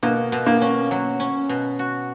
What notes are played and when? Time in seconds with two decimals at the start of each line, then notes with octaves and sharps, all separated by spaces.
0.03 B2 A#3
0.32 B2
0.47 A#3
0.61 C#4
0.91 F#3
1.20 C#4
1.49 B2
1.79 F#4